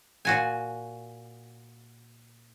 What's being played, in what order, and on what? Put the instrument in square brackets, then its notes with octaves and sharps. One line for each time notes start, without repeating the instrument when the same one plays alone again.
[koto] A#2 F#4 G#5